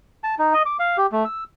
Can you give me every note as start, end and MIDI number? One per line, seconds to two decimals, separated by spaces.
0.24 0.35 81
0.39 0.53 63
0.54 0.62 75
0.66 0.77 86
0.79 0.97 77
0.97 1.07 67
1.12 1.25 57
1.25 1.44 88